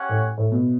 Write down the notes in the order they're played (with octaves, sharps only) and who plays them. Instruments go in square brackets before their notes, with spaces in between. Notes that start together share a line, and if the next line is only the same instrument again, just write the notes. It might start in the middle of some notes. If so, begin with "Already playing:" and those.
Already playing: [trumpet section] C#4 G4 C#5 F#5
[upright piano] A2
A2
B2